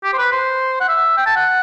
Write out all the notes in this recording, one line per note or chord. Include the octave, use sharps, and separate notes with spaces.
G4
C5
B4
C5
F#5
E5
G5
A5
F#5